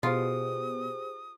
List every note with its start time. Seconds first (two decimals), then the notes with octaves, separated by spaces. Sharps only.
0.03 B2 F4 G4 G#4 C5 D#6